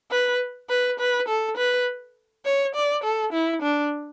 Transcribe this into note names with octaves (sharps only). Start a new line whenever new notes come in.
B4
B4
B4
A4
B4
C#5
D5
A4
E4
D4